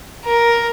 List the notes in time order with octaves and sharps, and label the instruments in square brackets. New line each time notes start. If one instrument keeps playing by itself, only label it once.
[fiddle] A#4